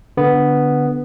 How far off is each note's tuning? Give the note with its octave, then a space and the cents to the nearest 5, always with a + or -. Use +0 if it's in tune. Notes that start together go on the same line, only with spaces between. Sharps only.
D3 +0 B3 +0